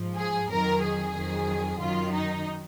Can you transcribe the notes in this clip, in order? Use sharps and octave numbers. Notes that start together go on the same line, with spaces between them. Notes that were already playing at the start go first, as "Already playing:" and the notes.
Already playing: G#2 F3
G#4
F2 D#3 F#3 A#4
G#4
F2 D#3 F#3
F#2 D#3 F#3 F4
D#4